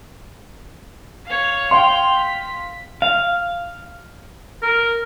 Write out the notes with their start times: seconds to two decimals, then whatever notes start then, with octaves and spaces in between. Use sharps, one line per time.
1.25 C#5 F5
1.71 F5 G5 C6 F7
2.18 B6
3.02 F5
4.62 A#4